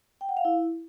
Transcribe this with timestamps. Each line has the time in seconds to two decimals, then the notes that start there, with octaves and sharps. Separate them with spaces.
0.21 G5
0.29 F#5
0.37 F5
0.45 E4